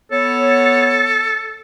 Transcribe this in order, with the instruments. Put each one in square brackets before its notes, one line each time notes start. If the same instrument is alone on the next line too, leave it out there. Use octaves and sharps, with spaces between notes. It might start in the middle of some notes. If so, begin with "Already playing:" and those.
[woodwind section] B3 C#5 [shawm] A4